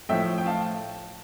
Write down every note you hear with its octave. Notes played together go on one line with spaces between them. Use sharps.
A2 F3 A3 E5 G5
G5
F5 A5